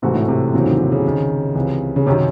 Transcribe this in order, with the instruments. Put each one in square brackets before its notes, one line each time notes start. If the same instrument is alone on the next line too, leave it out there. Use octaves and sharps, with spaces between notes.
[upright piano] G#2 E3 A3 C4 F#4 [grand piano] C3
[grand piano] A2
C3
[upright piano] E2 C#3 F#3 C4 [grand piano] E3
[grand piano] D#3
D#3
C#3
[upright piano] C2 C3 D#3
C#2 C3 E3
[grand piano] C#3
[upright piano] F#2 D#3 F#3 C#4 F#4 [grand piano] C3